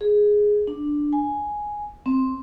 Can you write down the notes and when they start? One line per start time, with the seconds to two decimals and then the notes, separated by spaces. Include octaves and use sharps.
0.01 G#4
0.67 D4
1.13 G#5
2.06 C4